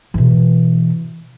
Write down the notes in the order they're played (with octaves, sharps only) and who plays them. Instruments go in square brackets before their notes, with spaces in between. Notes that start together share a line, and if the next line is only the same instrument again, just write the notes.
[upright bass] B2 E3